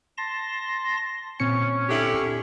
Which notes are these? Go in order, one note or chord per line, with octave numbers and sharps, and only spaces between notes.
A5 C6 A#6
A#2 C4 C#4 C#5 C#7
D3 E4 G4